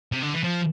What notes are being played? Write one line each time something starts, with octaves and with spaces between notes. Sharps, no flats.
C3
D3
E3
F3